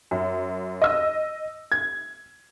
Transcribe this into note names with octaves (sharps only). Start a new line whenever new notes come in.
F#2
D#5 E6
G#6